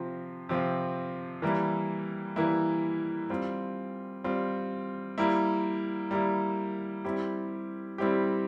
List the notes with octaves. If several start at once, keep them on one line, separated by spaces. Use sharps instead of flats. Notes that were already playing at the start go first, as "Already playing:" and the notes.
Already playing: C3 F3 C4 F4
C3 F3 C4 F4
E3 G3 A#3 E4
E3 G3 A#3 E4
G3 C4 F4
G3 C4 F4
G3 A#3 E4
G3 A#3 E4
G3 C4 E4 G4
G3 C4 E4 G4